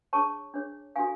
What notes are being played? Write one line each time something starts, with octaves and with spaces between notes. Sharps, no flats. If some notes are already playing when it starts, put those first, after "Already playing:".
D4 G#4 C#5 A5 C#6
D4 G#4 C#5
D4 F#4 A4 F5 G#5